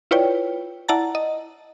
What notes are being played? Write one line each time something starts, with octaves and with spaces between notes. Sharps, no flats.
E4 F4 B4 C#5 D5 G5
E4 D5 F#5 A5 A#5 A6
D#5